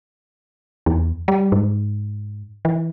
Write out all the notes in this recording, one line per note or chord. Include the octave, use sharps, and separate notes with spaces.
E2
G3
G#2
E3